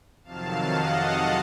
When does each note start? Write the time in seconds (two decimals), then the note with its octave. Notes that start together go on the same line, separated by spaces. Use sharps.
0.24 F2 C3 D#3 F#3 F5 A5
0.70 D#5 F#5